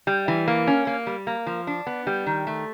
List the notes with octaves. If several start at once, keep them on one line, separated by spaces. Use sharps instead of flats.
G3
E3
A#3
C#4
A#3
G3
A#3
F3
D4
B3
G3
D#3
A3